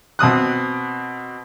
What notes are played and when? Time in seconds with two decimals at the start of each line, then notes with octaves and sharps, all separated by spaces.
0.19 B2 C4 D#6 F#6